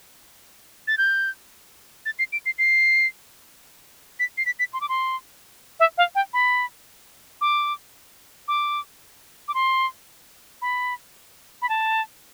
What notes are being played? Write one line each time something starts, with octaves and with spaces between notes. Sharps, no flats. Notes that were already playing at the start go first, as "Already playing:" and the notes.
A6
G6
A6
C7
D7
C7
C7
B6
C7
B6
B6
C6
D6
C6
E5
F5
G5
B5
D6
D6
D6
C6
B5
B5
A5